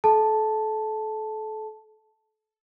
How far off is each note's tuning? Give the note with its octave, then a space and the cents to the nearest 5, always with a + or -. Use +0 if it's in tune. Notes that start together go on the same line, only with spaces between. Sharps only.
A4 -30 A5 +0